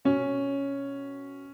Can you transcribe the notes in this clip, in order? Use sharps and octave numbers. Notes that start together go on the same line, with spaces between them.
B2 C#4